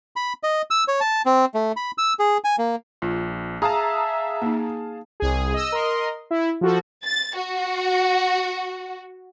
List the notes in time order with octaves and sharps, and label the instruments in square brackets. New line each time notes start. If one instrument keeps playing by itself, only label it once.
[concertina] B5
D#5
E6
C#5
A5
C4
A3
B5
E6
G#4
G#5
A#3
[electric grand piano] A#1 [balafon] F4
[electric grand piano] G#4 F5 A5 [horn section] E5 [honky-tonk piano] A#5 D#6
[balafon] A#3 D#4
[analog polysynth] C2 G#4
D#5 E6
A#4 D#5 C6
E4
F3 F#4 A4
[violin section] A6
F#4